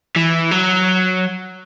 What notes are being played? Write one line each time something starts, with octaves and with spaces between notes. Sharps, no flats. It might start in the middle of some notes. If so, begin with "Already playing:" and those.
E3
F#3